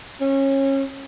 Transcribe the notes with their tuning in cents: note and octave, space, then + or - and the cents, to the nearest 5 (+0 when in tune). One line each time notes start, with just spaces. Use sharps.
C#4 -25